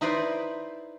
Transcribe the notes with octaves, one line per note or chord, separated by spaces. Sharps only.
D#4 E4 B4 C5 D5